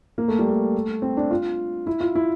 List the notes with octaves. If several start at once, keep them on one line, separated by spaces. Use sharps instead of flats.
A#3
A3
G3
A3
C4
D4
F4
E4
F4
E4